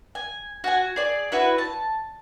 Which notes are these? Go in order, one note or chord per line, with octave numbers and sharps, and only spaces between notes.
G#5
F#4 G#5
G#4 D5
E4 F#4 B4
A5